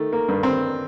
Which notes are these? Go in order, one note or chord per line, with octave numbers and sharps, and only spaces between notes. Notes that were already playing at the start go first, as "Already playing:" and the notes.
Already playing: D#3 A3
A#3
G2
C4